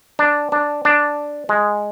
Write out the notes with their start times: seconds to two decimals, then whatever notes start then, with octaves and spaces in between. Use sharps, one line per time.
0.19 D4
0.52 D4
0.85 D4
1.49 G#3